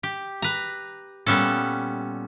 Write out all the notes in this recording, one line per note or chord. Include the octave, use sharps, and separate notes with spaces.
G4
B4 A#5
A#2 G3 B3 C#4 A4